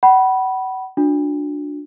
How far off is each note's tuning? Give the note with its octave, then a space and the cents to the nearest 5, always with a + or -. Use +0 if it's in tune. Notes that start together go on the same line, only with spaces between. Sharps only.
F#5 +35 B5 -15
D4 +0 F#4 -45